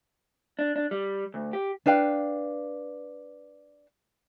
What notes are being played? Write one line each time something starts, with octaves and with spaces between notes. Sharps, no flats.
D4
D4
G3
D2
G4
D4 B4 F5 G5